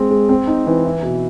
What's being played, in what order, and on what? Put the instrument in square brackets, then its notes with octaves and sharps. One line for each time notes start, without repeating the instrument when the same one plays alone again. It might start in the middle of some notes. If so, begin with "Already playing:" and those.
Already playing: [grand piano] G#3 C4
G#3
C4
D#4
E3
E4
B2